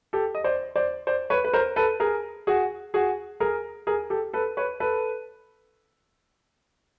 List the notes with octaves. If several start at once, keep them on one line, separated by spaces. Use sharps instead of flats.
G4 A4
D#5
C5 D5
C5 D5
C5 D5
B4 C#5
B4
A#4 C5
A4 B4
G#4 A#4
F#4 G#4
F#4 G#4
G#4 A#4
G#4 A#4
G4 A4
A4 B4
B4 C#5
A4 B4